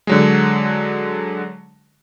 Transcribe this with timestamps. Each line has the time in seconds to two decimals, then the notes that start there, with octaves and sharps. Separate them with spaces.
0.07 D3 F#3 G#3